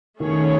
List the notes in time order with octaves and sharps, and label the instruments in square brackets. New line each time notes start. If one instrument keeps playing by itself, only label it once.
[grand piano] D#3 [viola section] A3 C#4 G#4 C#5